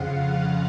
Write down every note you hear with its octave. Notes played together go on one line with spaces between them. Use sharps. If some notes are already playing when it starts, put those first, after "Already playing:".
Already playing: F2 C#3 F3 F5 F#5